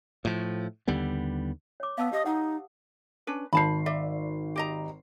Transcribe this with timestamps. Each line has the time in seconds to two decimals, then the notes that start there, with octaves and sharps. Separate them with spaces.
0.25 A2 F3
0.88 D#2 D3 G3 B3
1.80 C#5 D6
1.98 B3 F5 A5 E6
2.13 G4 D#5 D#6
2.26 D#4 F#5
3.27 C#4 D4 B4
3.53 G#1 C5 A5 B5 C7
3.86 D5 E5
4.56 G4 D#5 A#5